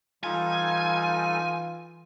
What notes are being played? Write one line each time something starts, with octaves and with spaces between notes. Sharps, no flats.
E3 G3 D#4 F4 A4 G#5